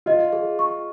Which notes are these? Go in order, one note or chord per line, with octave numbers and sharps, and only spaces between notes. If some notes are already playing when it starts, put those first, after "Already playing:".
F4 D#5
G#4
C#6